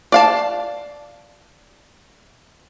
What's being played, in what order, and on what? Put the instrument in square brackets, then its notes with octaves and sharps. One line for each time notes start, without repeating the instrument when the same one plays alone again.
[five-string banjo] D5 F5 A5